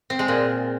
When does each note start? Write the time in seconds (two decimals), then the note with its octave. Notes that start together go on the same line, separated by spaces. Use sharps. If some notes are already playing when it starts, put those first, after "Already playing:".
0.10 C4
0.19 G#3
0.28 A#2